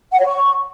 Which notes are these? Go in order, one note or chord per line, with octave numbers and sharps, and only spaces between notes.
F#5
C#5
C#6